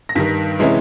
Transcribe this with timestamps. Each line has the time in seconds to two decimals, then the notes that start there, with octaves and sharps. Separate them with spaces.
0.09 A#6
0.15 G2 D#3 G3 B6
0.59 C3 E3 G#3 C#4 E4